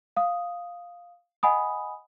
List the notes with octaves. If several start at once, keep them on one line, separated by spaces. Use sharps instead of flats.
F5 D#6
D#5 F#5 G#5 B5 D#6